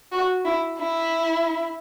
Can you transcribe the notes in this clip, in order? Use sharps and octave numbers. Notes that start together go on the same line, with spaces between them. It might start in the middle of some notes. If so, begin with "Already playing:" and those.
F#4
E4
E4